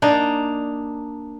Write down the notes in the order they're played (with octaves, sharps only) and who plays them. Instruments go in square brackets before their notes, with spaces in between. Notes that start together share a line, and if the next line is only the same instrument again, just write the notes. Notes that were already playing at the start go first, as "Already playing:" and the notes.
[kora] A#3 D4 D#4